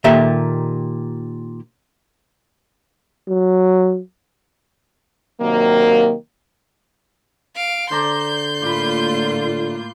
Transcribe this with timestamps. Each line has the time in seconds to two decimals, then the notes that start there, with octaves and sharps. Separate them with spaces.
0.04 A#2 D#3 G4 A4 E5
3.28 F#3
5.40 C3 D#3 F#3 A#3
7.55 F5 D7
7.91 D3 C5 D5 A#5 C6 G6
8.62 A2 A#3 F4 D5 B5